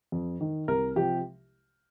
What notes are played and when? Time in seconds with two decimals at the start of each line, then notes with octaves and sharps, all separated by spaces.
0.12 F2
0.41 D#3
0.68 C2 A#4
0.96 C3 F3 G4